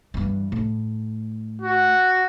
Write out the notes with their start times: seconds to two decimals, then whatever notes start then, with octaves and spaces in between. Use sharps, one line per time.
0.14 G2 E3
0.52 A2
1.61 F#4